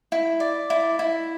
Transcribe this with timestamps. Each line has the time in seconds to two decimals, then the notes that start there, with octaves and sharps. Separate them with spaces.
0.12 E4
0.40 D5
0.70 E4
0.99 E4